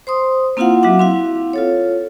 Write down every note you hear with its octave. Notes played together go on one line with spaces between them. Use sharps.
C5 C6 D#6
A#3 C4 E4 F4 F5 F#5
F#3 F#4 E5 F#5 D6
C4 E4 F5
F4 A4 C#5